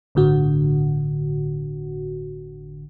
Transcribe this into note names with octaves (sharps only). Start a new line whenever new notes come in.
G1 A2 D3 F#4